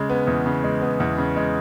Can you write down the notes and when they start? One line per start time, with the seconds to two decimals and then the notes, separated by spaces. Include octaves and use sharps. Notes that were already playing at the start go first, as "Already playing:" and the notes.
Already playing: C#3 G#3
0.10 B3
0.27 E2
0.46 C#3
0.64 G#3
0.82 B3
1.00 E2
1.18 C#3
1.36 G#3